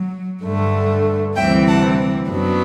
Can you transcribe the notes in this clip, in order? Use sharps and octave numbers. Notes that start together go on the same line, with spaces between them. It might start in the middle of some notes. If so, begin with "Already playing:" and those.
Already playing: F#3
G2 D3 A3
D2 C3 E3 G3 C4 E5 G5
F#5 A5
F#2 F#3 B3 D4